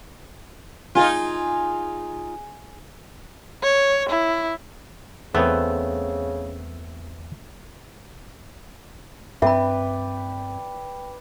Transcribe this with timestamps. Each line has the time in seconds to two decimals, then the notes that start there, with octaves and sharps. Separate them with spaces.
0.95 D#4 F4 G#4 G#5
3.63 C#5
4.09 E4
5.35 E2 C#3 A3 B3 C4 B4 E6
9.42 G2 C4 B4 D5 E5 G5 B5